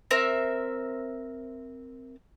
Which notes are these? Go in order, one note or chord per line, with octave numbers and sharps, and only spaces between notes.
C4 A#4 E5